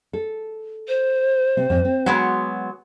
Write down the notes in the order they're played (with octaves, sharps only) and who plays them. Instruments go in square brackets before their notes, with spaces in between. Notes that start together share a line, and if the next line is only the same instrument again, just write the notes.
[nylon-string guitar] A4
[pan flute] C5
[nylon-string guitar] C3 C4
F2 G#2 C4
C4
[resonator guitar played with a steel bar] F#3 G#3 B3 [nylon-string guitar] F#4